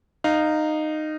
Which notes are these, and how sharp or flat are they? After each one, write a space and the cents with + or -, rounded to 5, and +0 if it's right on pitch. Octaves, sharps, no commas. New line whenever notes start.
D#4 -15 F5 +0